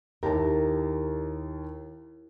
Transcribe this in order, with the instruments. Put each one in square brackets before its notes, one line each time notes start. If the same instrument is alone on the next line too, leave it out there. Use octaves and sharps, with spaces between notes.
[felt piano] D#2 A5 [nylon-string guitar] E4 G4 A#4